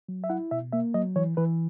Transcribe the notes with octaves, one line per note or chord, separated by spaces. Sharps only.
F#3
E5
E4 F#5
B2 E5
A#3 E5
F#3 D#5
E3 C#5
E3 B4